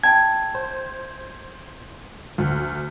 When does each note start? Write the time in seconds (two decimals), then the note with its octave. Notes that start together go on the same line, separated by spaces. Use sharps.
0.03 E4 G5 A5 G#6
0.55 C5
2.38 D2